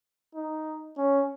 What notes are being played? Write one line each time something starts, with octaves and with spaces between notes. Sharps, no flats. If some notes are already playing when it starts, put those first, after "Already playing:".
D#4
C#4